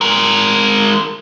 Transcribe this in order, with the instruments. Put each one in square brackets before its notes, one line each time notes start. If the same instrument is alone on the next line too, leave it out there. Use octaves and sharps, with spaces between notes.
[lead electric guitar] G#3 A#4